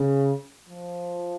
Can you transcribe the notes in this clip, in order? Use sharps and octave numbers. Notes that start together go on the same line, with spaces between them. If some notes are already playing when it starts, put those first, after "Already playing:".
Already playing: C#3
F3